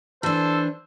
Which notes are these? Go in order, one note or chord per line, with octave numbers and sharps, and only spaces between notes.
E3 D4 A4 C5